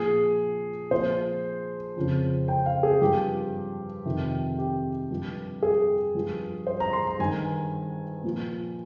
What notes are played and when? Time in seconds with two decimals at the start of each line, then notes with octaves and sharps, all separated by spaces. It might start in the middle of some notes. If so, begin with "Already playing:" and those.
Already playing: A#2 F3 G#4
0.91 A#2 F3 C5
1.96 F2 C#3 F3
2.48 G5
2.66 F5
2.83 G#4
3.01 G2 F3 G4
4.05 F2 C3 D#3
4.58 G4
5.11 G2 F3
5.63 G#4
6.15 G2 F3
6.67 C5
6.80 A#5
6.93 C6
7.07 A#5
7.19 G2 D#3 G#5
8.24 A#2 F3